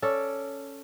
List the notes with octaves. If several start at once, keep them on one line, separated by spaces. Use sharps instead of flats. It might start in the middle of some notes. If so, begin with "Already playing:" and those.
C#4 A4 D5